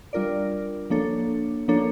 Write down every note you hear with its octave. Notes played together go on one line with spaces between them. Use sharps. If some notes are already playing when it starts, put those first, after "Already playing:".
G3 D4 F4 A#4 D5
F3 A#3 D4 A4 C#5
F3 A#3 D4 A4 C#5